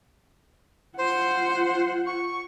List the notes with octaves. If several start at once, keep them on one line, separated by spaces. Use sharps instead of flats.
F4 C5 F#5
C#6